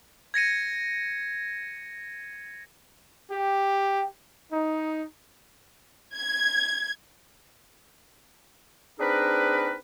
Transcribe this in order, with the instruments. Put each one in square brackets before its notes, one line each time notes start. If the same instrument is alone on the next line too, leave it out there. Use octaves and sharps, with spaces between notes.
[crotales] G#6 A#6 C#7 D#7
[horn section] G4
D#4
[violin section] G#6
[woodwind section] C4 D4 D#4 G#4 A#4 B4